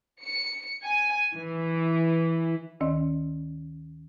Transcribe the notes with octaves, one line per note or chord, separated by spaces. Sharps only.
C#7
G#5
E3
D2 D#3 C#4 D#5